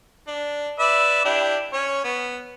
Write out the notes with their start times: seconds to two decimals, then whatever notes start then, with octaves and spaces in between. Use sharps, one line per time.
0.27 D4
0.79 B4 D5 E5
1.25 D4 E4 G4
1.73 C#4 C#5
2.04 B3